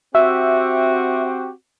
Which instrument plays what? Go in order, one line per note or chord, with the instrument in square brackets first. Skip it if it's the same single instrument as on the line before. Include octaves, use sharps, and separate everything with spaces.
[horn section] C4 F#4 G4 [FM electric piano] E5